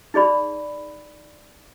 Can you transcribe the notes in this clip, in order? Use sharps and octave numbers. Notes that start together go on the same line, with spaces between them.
D#4 G#4 D5 B5